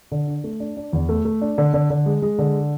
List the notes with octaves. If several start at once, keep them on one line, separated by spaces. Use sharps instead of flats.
D3
D4
A3
D4
D4
E2
A3
A3
D4
D3
D3
D3
G#3
G#3
D3